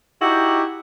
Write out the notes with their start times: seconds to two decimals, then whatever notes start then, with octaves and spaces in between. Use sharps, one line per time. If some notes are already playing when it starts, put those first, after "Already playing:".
0.22 D#4 E4 F#4 G4